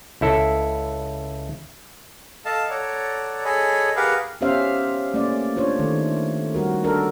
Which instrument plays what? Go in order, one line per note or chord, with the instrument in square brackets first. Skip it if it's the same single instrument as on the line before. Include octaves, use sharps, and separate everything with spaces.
[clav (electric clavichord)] C#2 E4 A4
[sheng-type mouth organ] A4 D#5 F5 A5
A4 C#5 D5 F#5 A#5
G#4 A4 C#5 D#5 G#5 B5
G4 G#4 A#4 B4 F5 F#5
[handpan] B3 C#4 G4 C5 E5 F5
A3 A#3 C#4 D5
D4 F4 C5 C#5
D#3 A3
G3 F#4 A#4
D4 A4 A#4